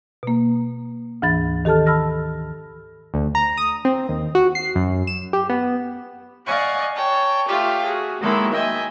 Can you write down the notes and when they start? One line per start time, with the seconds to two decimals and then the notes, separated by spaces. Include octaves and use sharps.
0.23 B2 A#3
1.22 D2 G#2 E3 B5 A6
1.65 D#3 G4 A4 A5 F6
1.86 A5 B5 E6 F6 A#6
3.14 D2
3.35 A#5
3.57 D#6
3.85 C4
4.09 D#2
4.35 F#4
4.55 C7
4.75 F#2
5.07 E7
5.33 G4
5.49 B3
6.46 D5 D#5 F5 F#5 G#5 C#6
6.95 C#5 G5 A5
7.47 A3 F4 G4 F5 G5
7.85 F#4 G#4
8.21 D#3 F#3 G#3 A#3 E4 A4
8.51 D#5 E5 G5 G#5